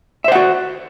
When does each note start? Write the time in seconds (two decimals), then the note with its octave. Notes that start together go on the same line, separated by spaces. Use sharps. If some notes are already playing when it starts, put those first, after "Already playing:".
0.24 E5
0.28 C5
0.32 F#5
0.35 F#4